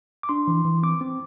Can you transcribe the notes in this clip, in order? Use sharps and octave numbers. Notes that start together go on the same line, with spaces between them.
D6
D4 C6
E3
E3
C4 D6
C4